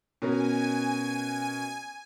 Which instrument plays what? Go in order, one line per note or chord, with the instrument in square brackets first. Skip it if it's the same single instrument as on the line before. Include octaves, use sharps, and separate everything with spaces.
[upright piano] B2 C#4 A#4 [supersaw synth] G#5